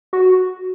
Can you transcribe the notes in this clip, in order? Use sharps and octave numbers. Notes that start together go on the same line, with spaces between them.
F#4